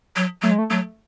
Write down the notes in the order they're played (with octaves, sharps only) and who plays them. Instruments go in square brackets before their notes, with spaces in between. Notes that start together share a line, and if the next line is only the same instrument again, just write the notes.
[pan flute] F#3
[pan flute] F#3 [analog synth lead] A3
[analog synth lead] G#3
A3
[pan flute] F#3 [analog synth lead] A3